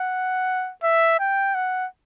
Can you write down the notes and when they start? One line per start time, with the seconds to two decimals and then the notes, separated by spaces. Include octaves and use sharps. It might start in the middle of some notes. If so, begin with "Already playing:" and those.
Already playing: F#5
0.84 E5
1.20 G5
1.55 F#5